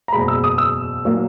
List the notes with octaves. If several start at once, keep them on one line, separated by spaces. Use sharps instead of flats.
A#5
F#1 E2 B2 G#3 B5
E6
D#6
E6
A#2 F#3 A#3